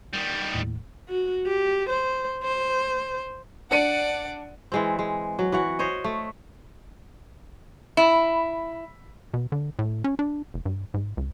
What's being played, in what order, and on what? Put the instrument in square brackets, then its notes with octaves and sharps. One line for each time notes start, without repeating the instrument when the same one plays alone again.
[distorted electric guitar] D#3 G3
[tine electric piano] D#2 A2
[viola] F#4
G4
C5
C5
[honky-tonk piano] D4 C#7 D#7 [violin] D5 F#5
[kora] E3 G#3 C4
G#3
F#3
E3 F#4 F#5
C5 C#5 D#5
A3
[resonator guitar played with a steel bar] E4
[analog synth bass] B2
D3
A2
C#4
D4
F1
G2
G#2
C#2